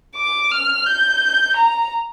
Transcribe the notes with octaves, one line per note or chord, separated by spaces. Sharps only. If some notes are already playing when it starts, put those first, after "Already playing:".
D6
F6
G6
A#5